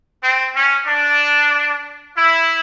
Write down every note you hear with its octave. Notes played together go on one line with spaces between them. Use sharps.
C4
C#4
D4
E4